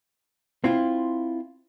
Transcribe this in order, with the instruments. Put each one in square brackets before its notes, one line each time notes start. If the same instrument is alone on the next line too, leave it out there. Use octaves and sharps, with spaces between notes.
[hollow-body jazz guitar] C4 E4 F4